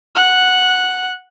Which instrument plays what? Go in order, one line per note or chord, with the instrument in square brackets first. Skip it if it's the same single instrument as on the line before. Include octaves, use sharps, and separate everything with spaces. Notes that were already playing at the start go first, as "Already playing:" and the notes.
[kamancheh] F#5 F#6